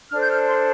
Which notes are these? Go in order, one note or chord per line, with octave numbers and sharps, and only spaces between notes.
D4 A4 C5 F6
G6
F6
C6